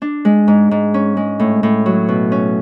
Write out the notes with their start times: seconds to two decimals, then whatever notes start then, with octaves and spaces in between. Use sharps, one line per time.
0.02 D4
0.25 G#3
0.48 G#2
0.71 G#2
0.94 C#4
1.17 G#3
1.40 A2
1.63 A2
1.86 F#3
2.08 B2
2.32 C#4